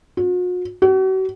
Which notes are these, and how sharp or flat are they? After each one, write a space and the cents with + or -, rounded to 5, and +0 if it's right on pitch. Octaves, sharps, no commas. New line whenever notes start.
F#4 -45
F#4 +40